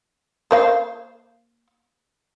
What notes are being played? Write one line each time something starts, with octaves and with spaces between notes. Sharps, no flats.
A#3 C5 F5